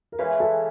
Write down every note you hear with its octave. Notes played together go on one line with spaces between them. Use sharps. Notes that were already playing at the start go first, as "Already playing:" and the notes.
A#4
C#3 E3 G#3 B4
A4